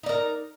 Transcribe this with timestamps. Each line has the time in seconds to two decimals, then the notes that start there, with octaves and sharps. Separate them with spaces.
0.03 D#4
0.06 D5
0.09 A#4